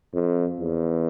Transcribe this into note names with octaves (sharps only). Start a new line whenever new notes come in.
F2
E2